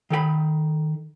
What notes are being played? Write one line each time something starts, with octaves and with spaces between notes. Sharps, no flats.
D#3 A4 G5 B5